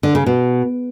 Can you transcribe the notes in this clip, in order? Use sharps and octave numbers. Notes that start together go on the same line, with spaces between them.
D3
C#3
B2